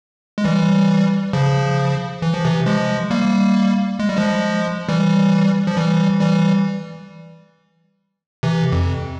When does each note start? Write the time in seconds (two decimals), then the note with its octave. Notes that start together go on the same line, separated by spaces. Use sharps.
0.38 G#3
0.44 E3 G3
1.33 C#3 F3
2.22 E3
2.34 F3
2.45 C3 E3
2.66 F3 G#3
3.10 G3 A#3
3.99 G#3
4.09 G3
4.17 F3 G#3
4.89 E3 G3
5.67 F3
5.77 E3 G3
6.21 E3 G3
8.43 C3 E3
8.72 F2